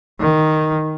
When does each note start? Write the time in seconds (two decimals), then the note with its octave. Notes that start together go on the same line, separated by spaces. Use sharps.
0.20 D#3